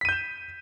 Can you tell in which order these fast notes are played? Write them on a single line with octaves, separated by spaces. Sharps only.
B6 D#7 G6 E7